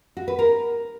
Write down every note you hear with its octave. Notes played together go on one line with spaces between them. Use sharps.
F#4
B4
A#4